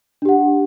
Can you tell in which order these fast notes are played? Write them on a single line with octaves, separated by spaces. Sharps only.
D4 G4 F#5